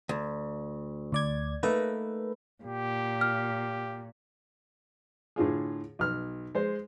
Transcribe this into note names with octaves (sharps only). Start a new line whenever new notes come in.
D2
D2 D5 G#6
A3 A#3 D#4 B4
A#2 G4
F6
A2 D3 F4 G#4
B1 F6
G#3 C5